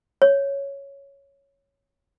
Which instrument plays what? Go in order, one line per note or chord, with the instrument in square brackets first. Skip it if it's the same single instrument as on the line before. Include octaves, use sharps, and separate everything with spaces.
[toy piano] C#5